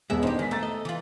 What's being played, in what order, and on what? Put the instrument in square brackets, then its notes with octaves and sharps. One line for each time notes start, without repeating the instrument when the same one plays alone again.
[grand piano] E1 G#4 [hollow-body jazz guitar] G#3 B3 [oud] E5
[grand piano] D4 C5 [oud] D#4 G4
[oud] D#3 [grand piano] G#5 B6
[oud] A3 [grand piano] A#5 A6
[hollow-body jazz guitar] D#5
[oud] E3 F4